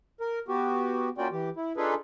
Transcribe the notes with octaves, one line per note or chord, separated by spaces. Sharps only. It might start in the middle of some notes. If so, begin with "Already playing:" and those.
A#4
B3 F#4 G4
A#3 C#4 F4 F#4 D5 G5
E3 G4
E4
D4 D#4 F4 G#4 A4 B4